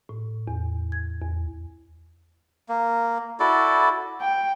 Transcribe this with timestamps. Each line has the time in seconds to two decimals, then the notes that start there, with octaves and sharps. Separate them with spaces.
0.09 A2
0.48 E2
0.92 G#6
1.21 E2
2.69 A#3
3.40 E4 F#4 A4 D5
4.20 G5